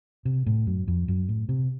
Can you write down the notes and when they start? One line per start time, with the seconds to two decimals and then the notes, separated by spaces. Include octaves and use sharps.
0.25 C3
0.46 A2
0.67 F#2
0.88 F2
1.08 F#2
1.29 A2
1.49 C3